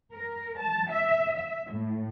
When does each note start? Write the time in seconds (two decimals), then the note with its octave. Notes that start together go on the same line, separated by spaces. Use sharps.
0.13 A#4
0.59 A5
0.90 E5
1.37 E5
1.71 A2